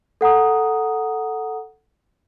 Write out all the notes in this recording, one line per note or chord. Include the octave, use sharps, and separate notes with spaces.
A4 F#5 A#5 D#6